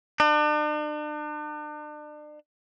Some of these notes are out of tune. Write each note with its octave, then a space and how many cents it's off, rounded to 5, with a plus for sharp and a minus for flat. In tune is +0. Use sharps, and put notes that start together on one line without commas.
D4 +40